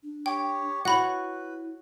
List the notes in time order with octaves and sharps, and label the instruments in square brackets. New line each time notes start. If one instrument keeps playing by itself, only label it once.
[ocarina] D4
[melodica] G4 C#5 [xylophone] G5
[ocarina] E4 [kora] F#4 C#5 [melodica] B4 [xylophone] F#5 B5